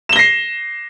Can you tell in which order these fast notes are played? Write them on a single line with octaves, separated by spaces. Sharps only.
E7 G7 A#6 C7